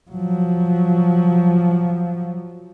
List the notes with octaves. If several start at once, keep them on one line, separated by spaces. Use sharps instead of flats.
F3 F#3